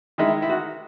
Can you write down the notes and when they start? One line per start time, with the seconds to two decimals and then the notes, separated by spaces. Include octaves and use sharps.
0.18 D#3 G#3 D#4 E4
0.42 E4
0.49 F#4